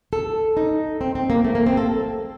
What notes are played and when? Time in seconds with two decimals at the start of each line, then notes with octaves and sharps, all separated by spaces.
0.13 A4
0.57 D#4
1.01 C4
1.15 C4
1.30 A#3
1.44 A3
1.55 A#3
1.66 C4
1.77 A4